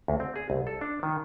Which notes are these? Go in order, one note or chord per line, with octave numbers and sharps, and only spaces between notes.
D2
C4
G#4
C2
A4
D4
D#3